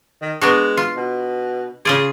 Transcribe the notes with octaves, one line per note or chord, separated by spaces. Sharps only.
D#3
G#3 B3 D4 F#4
F4
B2
C#3 F4 G#4 D5